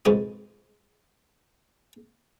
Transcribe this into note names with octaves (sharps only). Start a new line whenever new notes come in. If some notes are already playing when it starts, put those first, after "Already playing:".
F2 G#2 B2 G#3 C5 D#6